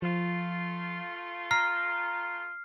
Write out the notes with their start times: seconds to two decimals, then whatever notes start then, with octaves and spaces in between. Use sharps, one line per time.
0.02 F3 A3 F4
1.51 A#5 F6 C7